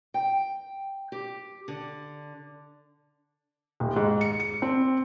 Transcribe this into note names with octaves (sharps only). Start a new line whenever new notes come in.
G5
G4
D3
D#1
G#2
C#7
C#7
C4